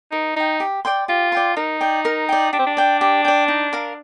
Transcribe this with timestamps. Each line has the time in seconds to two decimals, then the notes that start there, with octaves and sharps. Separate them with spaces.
0.12 D#4 A#4
0.36 D#4 D#5 G5
0.60 G4
0.85 D5 G5 C6
1.08 F4 G4
1.32 D5 G5 C6
1.56 D#4 A#4
1.81 D5 G5
2.05 A#4
2.29 D5 G5
2.53 D4 G4
2.59 C4
2.67 D4
2.77 D5 G5
3.01 G4
3.25 D5 G5
3.48 D#4
3.73 A#4 F5 A#5